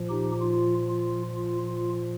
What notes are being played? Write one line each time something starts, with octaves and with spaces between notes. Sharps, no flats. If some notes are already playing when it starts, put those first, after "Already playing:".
Already playing: A#2 F3
D#4 G4
F4
F4
F4
F4